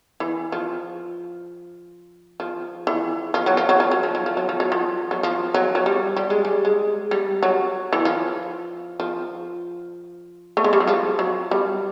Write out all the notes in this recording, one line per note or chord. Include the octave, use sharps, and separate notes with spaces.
E3
F3
F3
E3
F3
F#3
F3
F#3
F3
F#3
F3
F#3
F3
F#3
F3
F#3
F3
F#3
F3
F#3
F#3
G3
G3
G#3
G3
G#3
G3
F#3
E3
F3
F3
A3
G#3
G3
F#3
F3
F#3
G3